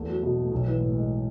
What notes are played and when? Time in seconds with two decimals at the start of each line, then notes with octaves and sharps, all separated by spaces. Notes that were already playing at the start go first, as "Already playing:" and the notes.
Already playing: E2 A3
0.08 F#3
0.23 B2
0.37 A3
0.51 B1
0.67 E3
0.80 A2
0.95 G#3